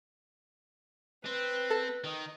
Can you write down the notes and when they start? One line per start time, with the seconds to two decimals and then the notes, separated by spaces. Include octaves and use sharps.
1.25 C4 B4
1.70 A4
2.04 D#3 D#5